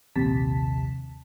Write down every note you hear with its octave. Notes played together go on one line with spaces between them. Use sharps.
A#1 D#2 C3 A5 B6